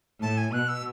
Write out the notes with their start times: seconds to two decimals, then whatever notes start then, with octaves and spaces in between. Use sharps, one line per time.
0.22 A2 A5
0.38 G#5
0.52 B2 F#6
0.68 E6